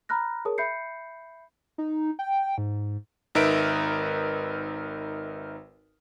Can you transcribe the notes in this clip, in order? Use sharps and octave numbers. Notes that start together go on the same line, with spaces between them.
A#5 B5 F6 F#6 A#6
G#4 A#4 C#5 A5 D#6
E5 B5 G6 C7 C#7
D#4
G5
G#2
G#1 D#4 A#4 B4 E5 D7